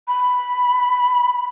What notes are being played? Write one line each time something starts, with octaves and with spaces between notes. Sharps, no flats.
B5